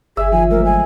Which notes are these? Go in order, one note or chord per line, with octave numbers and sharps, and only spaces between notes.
G1 G#4 E5
D#3 F3 D#4 G#5
F#3 G#3 A3 A#4
G#5